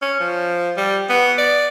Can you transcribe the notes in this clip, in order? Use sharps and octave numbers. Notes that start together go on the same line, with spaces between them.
C#4
F3
G3
B3
D5